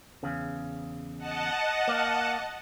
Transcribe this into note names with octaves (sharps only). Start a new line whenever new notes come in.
E2 C#3
D#5 F#5 A5
A#3